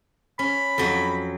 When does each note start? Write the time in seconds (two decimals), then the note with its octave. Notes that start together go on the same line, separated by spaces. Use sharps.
0.39 C#4 B5
0.78 F2 F#3